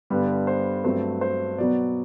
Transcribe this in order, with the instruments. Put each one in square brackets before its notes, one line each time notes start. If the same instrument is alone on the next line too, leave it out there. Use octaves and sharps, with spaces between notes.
[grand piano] G2 D3 G3 B3
C5
G2 F#3 A3 C4 C5
C5
B2 F#3 B3 D5